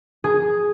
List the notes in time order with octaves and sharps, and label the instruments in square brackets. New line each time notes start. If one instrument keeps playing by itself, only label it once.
[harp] G#4